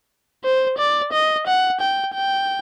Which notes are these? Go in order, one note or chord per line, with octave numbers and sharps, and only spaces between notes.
C5
D5
D#5
F#5
G5
G5